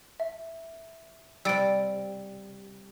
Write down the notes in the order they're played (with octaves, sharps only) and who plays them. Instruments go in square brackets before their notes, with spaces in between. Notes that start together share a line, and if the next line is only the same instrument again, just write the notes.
[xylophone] E5
[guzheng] C3 G3 [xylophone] E6 A6 D7